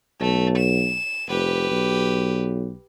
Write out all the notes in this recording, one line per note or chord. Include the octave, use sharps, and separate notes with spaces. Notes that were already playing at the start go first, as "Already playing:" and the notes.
B1 A3
E7
F1 G4 B4
B1